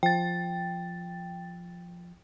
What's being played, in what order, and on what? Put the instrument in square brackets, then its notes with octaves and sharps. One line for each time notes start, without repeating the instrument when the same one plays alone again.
[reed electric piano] F3 [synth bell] G5 A6